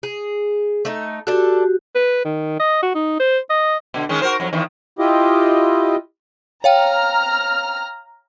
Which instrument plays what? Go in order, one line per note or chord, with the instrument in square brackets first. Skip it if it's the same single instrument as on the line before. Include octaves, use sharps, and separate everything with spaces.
[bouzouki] G#4
A3 D#4
[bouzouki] D4 A4 [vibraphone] F#4 G4
[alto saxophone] B4
D#3
D#5
F#4
D#4
C5
D#5
[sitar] B2 D3
D#3 G#3 C#4
F#4 A#4 C5
F2 F#3
E2 D#3 E3
[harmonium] E4 F4 G4 D#5
[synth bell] C#5 F5 G5 [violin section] A#5 F6